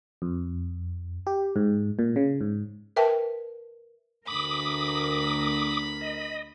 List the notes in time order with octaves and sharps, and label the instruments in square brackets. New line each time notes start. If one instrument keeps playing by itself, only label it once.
[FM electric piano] F2
G4
G#2
A#2
C#3
G#2
[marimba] A#4 B4 E5 G5 A5
[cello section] D2 A#4 [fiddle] B5 [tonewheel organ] D6 D#6
[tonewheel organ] D#5